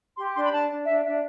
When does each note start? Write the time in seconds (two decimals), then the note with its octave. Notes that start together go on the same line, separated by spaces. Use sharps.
0.17 G4 C6
0.35 D4 C6
0.44 B5
0.52 D4 A5
0.70 D4
0.87 D4 E5
1.05 D4 E5